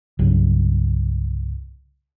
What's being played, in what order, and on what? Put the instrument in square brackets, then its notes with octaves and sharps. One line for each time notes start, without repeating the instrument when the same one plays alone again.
[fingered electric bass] C2 G2 C#3 F#3